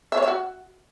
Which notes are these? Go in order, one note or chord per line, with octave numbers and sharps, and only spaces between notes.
E5
C#5
E5
F#4